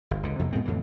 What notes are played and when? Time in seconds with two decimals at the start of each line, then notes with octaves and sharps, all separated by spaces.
0.11 G1
0.23 C#2 D3
0.39 F2 C3 F3 A#3
0.52 A2 G#3 B3 C4
0.65 F2 A2 D3 E3